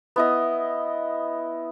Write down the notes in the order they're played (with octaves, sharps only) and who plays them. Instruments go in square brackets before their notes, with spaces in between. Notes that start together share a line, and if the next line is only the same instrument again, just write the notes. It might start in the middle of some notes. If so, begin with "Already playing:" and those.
[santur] B3 E4 D#5